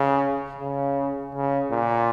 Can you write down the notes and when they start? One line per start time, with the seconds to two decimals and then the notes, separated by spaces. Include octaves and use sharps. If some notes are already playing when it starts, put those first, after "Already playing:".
Already playing: C#3
0.61 C#3
1.35 C#3
1.71 A#2